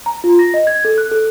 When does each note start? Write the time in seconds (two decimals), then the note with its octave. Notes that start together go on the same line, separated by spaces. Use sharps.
0.06 A#5
0.24 F4
0.39 A#6
0.54 D#5
0.67 G#6
0.85 A4
0.98 F#6
1.11 A4